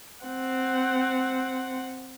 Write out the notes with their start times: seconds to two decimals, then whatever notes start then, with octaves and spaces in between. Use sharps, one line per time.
0.24 C4 F#5